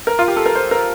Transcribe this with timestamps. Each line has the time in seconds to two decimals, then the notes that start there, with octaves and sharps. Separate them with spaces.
0.07 A#4
0.19 F4
0.28 G4
0.37 A4
0.46 A#4
0.55 C5
0.71 A#4